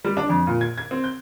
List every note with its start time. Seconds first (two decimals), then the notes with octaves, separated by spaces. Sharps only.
0.05 G3
0.17 D4
0.29 F2
0.47 A#2
0.61 G#6
0.78 G#6
0.91 C4
1.04 G6